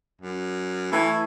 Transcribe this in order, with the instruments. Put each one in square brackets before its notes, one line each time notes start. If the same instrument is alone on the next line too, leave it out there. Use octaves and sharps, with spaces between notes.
[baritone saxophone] F#2
[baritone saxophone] E3 [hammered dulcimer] A3 E4 G#5